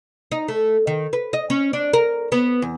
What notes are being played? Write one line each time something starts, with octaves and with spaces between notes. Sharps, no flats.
D#4
A3
D#3
B4
D#5
C#4
D4
A#4
B3
E2